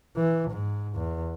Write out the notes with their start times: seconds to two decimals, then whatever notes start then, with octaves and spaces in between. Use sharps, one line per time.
0.17 E3
0.51 G#2
0.95 E2